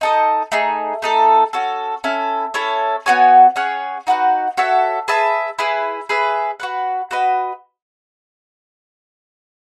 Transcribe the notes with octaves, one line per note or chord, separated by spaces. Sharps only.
D#4 A4 D#5
A3 D#4 G#4
A3 D#4 A4
C#4 F#4 A4
C#4 E4 A4
C#4 E4 A4 C#5
B3 F#4 C#5 G#5
C#4 G#4 C#5 F#5
D#4 F#4 B4 F#5
F#4 A4 C#5 E5
G#4 B4 E5 A5
E4 G#4 B4
G#4 B4 E5
F#4 B4 F#5
F#4 B4 D#5